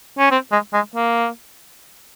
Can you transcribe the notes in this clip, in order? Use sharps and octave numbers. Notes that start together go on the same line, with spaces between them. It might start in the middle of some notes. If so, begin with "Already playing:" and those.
C#4
C4
G#3
G#3
A#3